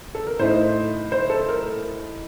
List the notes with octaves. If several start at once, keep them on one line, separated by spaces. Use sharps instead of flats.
A4
A#4
A2 A3 D#4 C5
C5
A4
A#4